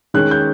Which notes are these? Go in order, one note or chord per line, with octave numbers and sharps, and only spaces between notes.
D#3 G#3 C#4 F#6
G6